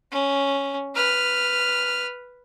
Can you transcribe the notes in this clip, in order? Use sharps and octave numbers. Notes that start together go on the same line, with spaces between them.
C#4
B4 F6